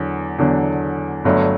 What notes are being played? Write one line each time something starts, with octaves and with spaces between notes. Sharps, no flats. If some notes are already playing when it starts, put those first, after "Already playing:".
Already playing: E2 D3 F#3
E2 D3 F#3
G1 G2 F#3 A3